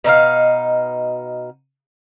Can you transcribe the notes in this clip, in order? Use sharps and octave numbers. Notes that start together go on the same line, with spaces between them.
B2 D#4 A4 F5